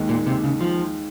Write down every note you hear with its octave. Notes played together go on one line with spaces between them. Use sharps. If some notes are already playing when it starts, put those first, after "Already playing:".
Already playing: D#2 D#3 G#3 D#4
A#2
C3
C#3
F3